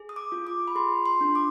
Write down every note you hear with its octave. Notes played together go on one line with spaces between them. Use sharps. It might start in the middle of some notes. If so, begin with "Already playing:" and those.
Already playing: G#4
D#6
D6
F4
D6
B5
G#4 C6
C6
D4
D6